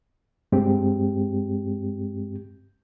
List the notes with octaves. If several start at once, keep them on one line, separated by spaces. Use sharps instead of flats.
G2 G#3 C4 G4